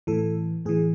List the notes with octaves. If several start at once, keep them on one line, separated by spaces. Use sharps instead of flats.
A2 E3 A4
A2 E3 G#4